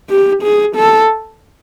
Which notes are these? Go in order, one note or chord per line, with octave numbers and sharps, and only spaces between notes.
G4
G#4
A4